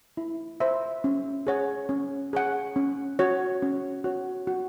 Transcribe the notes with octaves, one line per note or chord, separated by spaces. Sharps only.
E4
C5 E5 C6
C#4
G#4 C#5 F#5
C#4
G#4 C#5 F#5
C#4
F#4 C#5
C#4
F#4 C#5
F#4